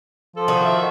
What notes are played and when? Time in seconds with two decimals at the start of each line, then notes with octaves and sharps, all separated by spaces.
0.36 F3 A4
0.48 D#3 F#4
0.65 E5